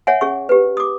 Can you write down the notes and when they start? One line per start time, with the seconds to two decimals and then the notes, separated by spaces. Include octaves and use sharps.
0.07 C#5 E5 F#5 G#5
0.21 C#4 G#4 C#6
0.49 G4 B4
0.77 D6 D#6